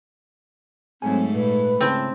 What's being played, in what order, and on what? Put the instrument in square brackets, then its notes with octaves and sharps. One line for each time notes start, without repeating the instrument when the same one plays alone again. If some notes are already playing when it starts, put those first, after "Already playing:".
[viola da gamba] G#2 A3 [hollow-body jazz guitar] F#3 C#5 G#5 [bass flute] C4
[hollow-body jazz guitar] A#2 [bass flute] B4
[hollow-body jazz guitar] C#3 E4 A5 [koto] C4